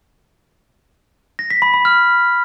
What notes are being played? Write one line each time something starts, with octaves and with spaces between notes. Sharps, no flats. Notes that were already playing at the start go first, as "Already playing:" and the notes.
A#6
B6
B5
B5
F6